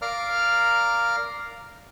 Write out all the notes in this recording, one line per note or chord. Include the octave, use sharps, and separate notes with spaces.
A#4 D5 F5 A#5 F6